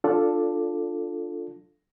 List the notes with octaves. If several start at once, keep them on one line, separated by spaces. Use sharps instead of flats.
D4 F4 A4 D5